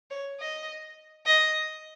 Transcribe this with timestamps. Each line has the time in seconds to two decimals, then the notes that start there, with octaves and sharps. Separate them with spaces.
0.11 C#5
0.40 D#5
1.26 D#5